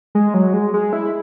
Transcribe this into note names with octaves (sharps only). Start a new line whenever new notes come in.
G#3
F#3
G#3
G#3
E4